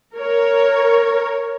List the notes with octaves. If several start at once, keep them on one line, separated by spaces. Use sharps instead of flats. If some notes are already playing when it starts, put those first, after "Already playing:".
A#4 C#5